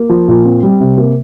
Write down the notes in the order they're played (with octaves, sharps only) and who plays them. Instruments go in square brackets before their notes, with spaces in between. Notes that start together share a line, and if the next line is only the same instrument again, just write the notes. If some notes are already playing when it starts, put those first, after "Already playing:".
Already playing: [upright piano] A#3
F3
A#2
C4
G3
C3
A#3